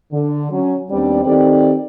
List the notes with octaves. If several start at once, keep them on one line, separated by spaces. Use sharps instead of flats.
D3
F#3 C#4
D#2 G3 B3 C4 D4 D5
D#3 C4 G4 A4 D5